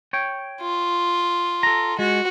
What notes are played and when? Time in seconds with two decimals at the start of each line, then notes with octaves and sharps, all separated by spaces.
0.13 C#5 G5
0.61 F4
1.63 A4 A#5
1.99 G#3 F#4